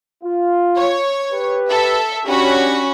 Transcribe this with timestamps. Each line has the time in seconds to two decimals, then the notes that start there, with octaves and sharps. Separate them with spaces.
0.24 F4
0.76 C#5
1.32 G4 B4
1.69 A4 E5
2.27 C#4 D4 F#4 G4 B5